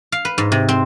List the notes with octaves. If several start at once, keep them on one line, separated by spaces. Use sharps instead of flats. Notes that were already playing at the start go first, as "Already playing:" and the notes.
F5
B4
G#2
C3
C4